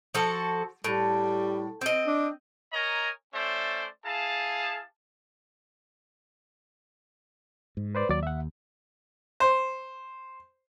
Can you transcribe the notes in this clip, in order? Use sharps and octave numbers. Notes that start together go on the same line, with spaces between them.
F3 F#4 A4
A2 G3
C4 D#5
D4
A#4 C#5 D#5 G#5 A#5
A3 C#4 C5 D5 E5
E4 G#4 F5 A5
G#2
B4 C5 D5
D#2 F#3 D5
E5 F#5
C5